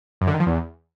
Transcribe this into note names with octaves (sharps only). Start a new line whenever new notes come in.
F#2
D3
D#3
F3
E2